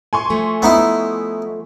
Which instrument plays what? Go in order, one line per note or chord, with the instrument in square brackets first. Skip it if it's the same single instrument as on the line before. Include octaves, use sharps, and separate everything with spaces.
[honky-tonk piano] G#5 C6 C#6
[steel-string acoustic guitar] F3 A3
[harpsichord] B3 D#4 E4